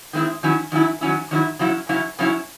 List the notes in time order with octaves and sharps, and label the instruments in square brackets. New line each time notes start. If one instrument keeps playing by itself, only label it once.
[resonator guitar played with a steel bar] D#3 G#3 C4 E4
D#3 F#3 C#4 E4
D#3 F#3 C#4 E4
D#3 F#3 C#4 E4
D#3 F#3 C#4 E4
C#3 F#3 C#4 E4
C#3 F#3 C#4 E4
C#3 F#3 C#4 E4